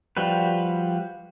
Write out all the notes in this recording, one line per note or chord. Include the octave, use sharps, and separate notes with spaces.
F3 G3 F#4 B4